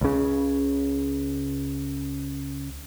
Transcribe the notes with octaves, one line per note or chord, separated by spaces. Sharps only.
C#2 C#3